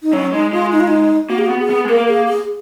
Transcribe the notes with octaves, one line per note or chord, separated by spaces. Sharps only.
D#4
F#3 C#4
G#3 D#4
G#3 F4
D#4
F4
D#4
A#3 F#4
G#4
B3 F#4
G#4
B3
G#3
A#3 A#4
G#4
G#4